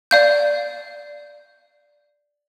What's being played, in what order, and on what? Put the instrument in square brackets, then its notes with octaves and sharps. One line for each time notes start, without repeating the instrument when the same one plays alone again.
[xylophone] D5 F5 G6